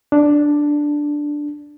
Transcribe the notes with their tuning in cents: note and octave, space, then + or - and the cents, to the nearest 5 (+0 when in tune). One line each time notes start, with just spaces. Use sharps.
D4 +0